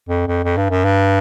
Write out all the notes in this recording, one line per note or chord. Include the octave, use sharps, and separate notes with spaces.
F2
F2
F2
G2
F#2
G2